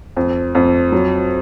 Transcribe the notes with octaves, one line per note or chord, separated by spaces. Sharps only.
F2
F2
F#3